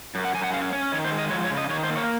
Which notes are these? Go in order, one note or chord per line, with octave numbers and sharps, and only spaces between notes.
F#2
F#5
F#2 G#5
F#5
C#4 F5
C#4 C#5
D#3 C#5
C5
G#3
D#5
F3 C#5
C#5
C#3
D#5
D#3 C#5
C5
A#3
C#5